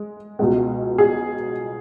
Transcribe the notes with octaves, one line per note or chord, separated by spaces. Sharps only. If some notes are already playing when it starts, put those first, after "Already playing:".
Already playing: G#3
C#2 B2 G#3
G#4